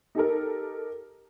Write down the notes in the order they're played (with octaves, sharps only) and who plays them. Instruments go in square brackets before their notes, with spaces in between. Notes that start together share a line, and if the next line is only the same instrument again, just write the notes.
[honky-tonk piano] D#4 G4 A4 A#4